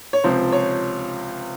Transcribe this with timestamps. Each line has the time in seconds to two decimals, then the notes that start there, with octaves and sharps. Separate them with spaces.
0.13 C#5
0.24 C#2 C3 F3 C5
0.52 C#5